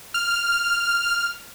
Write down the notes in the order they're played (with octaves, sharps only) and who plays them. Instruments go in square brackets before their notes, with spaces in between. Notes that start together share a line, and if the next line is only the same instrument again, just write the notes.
[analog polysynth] F6